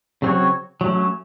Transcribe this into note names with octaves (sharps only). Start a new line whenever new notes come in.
C#3 F#3 C4 F#4 C#5
F#3 A3 C#4